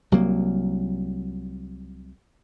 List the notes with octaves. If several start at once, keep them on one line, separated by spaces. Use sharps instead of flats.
C2 F#3 A#3